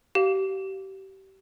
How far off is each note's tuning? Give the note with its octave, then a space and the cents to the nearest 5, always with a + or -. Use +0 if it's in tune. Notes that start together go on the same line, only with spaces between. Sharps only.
G4 -30 F5 +5